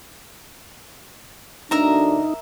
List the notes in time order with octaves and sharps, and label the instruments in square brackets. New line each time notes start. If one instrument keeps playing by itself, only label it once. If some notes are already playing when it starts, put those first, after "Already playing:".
[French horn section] D2 D4 [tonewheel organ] D#4 [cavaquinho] A#4 E5 A#5